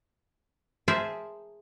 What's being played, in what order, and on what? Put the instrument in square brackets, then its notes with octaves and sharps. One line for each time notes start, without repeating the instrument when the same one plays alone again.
[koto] G#4 A#4 C5 E5 G#5 A5